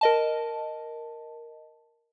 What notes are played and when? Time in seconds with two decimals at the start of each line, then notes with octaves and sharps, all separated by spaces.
0.01 A#4 D#5 A5